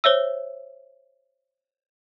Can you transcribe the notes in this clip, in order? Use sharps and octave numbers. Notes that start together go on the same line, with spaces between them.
C5 C#5 E5 E6